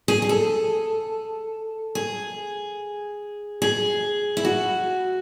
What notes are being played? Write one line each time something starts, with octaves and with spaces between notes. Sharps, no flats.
G#4
G#4
A4
G#4
G#4
E4
F#4